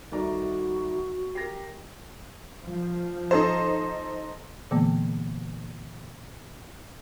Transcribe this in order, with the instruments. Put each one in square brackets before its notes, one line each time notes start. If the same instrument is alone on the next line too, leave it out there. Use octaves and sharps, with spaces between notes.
[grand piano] C2 D5 A#5 [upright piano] D#3 A3 [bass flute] F#4
[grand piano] G4 [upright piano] A#4 A#6 C7
[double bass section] F3
[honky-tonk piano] D#4 A4 C5
[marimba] A#2 D3 E3 G#3 A#3 B3